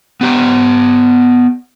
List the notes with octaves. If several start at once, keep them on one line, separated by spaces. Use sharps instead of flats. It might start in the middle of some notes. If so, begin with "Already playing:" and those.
B3 G4 A#5